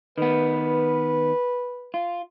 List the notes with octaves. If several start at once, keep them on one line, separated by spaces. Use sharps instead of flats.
D#3 B3 B4
F4